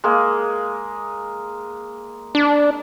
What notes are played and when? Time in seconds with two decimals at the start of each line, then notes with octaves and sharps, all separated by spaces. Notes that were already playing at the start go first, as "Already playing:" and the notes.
0.04 G#3 A#3 G#4
2.35 D4